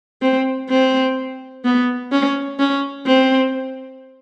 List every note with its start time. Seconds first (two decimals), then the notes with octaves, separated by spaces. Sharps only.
0.22 C4
0.70 C4
1.64 B3
2.12 C#4
2.59 C#4
3.06 C4